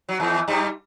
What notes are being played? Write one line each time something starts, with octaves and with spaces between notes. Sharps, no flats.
F#3
E2 E3
G2 G3